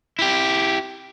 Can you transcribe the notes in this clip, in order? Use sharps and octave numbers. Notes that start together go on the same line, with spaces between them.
E4 G4